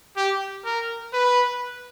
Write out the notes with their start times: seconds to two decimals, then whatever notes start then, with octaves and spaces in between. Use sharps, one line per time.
0.17 G4
0.65 A#4
1.13 B4